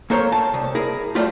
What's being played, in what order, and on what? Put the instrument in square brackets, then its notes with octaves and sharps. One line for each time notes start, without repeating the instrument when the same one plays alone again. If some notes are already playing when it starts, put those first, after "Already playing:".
[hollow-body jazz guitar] A#3 A4 A#4 C5 C#5
A5
C2
E4 G#4 A#4
F#3 G3 A3 E4 F4